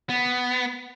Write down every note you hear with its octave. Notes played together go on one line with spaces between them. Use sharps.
B3